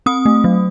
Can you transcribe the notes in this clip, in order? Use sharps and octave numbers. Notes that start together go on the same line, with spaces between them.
C4 D#6
A3
F#3